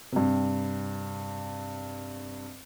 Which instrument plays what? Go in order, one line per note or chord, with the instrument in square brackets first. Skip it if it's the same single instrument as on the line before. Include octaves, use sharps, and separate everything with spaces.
[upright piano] G2 C3